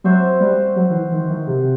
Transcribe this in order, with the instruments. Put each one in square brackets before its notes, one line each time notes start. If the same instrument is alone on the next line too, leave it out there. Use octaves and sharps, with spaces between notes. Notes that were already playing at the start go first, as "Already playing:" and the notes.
[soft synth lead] F#3 [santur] C4 F#4 C5 E5
[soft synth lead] G3
F#3
D#3
E3
D#3
D#3
C3